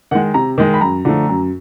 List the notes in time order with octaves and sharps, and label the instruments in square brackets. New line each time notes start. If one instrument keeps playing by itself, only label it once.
[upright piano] D#3 G#3 F#5
C3 A#5
D#3 G#3
B5
F#2 A#5
D3 F3 A3
F#2